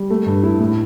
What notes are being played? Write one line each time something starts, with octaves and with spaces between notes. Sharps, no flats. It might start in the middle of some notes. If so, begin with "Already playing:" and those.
Already playing: G3
A3
G2
E4
A2